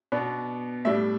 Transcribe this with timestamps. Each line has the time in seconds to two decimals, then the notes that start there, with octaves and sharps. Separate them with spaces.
0.12 B2 B3 D4
0.85 A2 G3 D4 E5